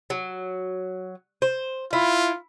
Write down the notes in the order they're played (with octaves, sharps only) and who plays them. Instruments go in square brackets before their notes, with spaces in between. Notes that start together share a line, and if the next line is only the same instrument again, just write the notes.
[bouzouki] F#3
C5
[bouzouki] E4 [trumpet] F4